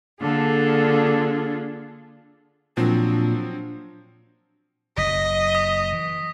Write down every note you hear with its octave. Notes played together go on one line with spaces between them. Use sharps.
D3 A#3 D4 F4 G#4 A4
A#2 F3 F#3 C4 D4
F#1 F#3 D#5 A#6 B6
D#6 B6
E3